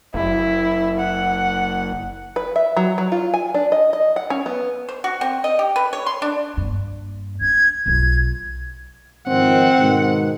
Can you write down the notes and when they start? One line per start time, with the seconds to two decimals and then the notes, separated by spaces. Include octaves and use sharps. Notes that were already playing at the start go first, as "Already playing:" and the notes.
0.14 F#1 E4
0.99 F#5
2.36 B4
2.56 E5
2.77 F#3
2.98 F#3
3.12 F4
3.34 G#5
3.54 D4
3.72 D#5
3.93 D#5
4.16 F#5
4.30 C#4
4.46 B3
4.89 C5
5.04 F#4
5.21 C4
5.44 D#5
5.59 G4
5.76 B4
5.93 C#5
6.06 C6
6.22 D4
6.57 G2 A#3
7.41 D4 G#6
7.86 B1 F4 G#6
9.28 G#2 D#3 F3 C4 F#5
9.78 G#2 B2 D#3